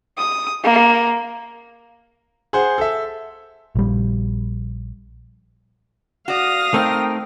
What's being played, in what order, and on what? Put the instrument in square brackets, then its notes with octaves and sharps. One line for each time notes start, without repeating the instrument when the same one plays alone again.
[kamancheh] D#6
A#3
[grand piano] G#4 C5 F#5
A4 E5
[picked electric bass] A#1 G3
[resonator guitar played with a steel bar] F#4 D5 [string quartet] F5 D#6 A#6
[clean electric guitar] A3 C4 D#4 [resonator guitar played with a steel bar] A#4 [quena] G5